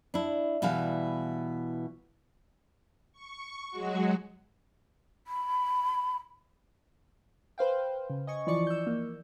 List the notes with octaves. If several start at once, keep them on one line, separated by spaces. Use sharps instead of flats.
D4 E4
B2 E3 G3 E4 F5
C#6
F#3 G#3 F#4
B5
B4 C5 F5 G5
C#3
D#5 G#5 C#6
E3 F3 D5 C#6 C#7
E6 G6
A#3